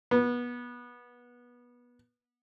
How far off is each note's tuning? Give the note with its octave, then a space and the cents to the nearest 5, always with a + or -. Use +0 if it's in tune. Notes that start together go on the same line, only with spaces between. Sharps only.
B3 -20